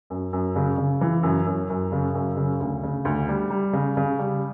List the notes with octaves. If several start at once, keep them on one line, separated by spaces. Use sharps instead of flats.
F#2
F#2
C#3
C#3
E3
F#2
F#2
F#2
C#3
F#2
C#3
D2
C#3
D2
G3
G3
C#3
C#3
G3